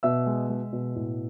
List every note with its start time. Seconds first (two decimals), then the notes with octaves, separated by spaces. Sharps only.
0.03 B2 E5 E6
0.26 G#3
0.49 G#3
0.73 B2
0.95 A2